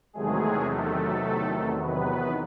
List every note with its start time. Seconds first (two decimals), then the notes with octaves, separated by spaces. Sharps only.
0.13 E2 C3 D#3 F#3 G#3 A3 G#4
0.69 A3 A4
1.80 B3 B4